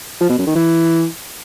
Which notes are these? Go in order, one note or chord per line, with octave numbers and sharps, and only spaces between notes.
F3
B2
F#2
D#3
E3